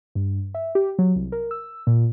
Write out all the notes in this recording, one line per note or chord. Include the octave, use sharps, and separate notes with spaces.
G2
E5
G4
F#3
C2
A#4
E6
A#2